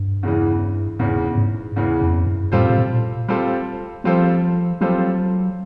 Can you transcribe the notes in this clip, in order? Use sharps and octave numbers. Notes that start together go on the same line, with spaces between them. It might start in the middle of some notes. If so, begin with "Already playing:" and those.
Already playing: G2
E2 C#3 E3
E2 G#2 C#3 E3
G#2
E2 C#3 E3
F2
F#2
A2 G3 C4 F4 A4 C5
A2
A#2
G3 C4 F4 A4 C5
F3 G3 C4 F4 A4 C5
F#3 G3 C4 F4 A4 C5